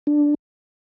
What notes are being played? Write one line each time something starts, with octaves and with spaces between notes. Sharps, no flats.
D4